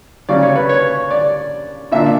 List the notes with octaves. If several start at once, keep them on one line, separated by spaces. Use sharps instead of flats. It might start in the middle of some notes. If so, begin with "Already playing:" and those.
C#3 F#3 C#4 D5
C#5
B4
C#5
D5
A#2 A#3 D4 E5